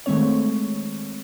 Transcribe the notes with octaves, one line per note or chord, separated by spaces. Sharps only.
D#3 G#3 A3 C4 C#5